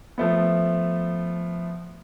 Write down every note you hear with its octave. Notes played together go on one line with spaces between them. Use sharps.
F3 A3 B3